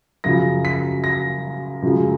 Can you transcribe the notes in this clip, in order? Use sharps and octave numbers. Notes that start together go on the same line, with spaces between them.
F#2 C#3 F3 A#6
B6
A#6
F#2 C#3 F3 G#3